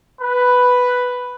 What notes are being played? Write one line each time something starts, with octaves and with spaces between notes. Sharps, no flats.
B4